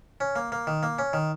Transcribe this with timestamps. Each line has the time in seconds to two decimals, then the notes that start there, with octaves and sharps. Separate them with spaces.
0.20 C#4
0.36 A#3
0.52 A#3
0.67 D#3
0.83 A#3
0.99 C#4
1.13 D#3